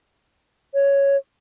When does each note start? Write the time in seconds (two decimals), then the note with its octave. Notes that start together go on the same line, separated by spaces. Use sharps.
0.74 C#5